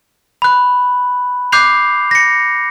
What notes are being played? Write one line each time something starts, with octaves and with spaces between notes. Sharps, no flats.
B5 F#6
D6 F#6 G6 C7 F7
A#6 C#7